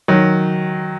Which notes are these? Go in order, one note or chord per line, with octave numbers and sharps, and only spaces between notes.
D#3 F#3